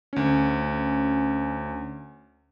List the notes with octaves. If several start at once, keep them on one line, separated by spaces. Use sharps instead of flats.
D2 C#4